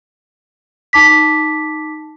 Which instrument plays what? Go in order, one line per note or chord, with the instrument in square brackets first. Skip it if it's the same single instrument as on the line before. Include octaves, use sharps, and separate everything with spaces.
[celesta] D#4 A5 D6 B6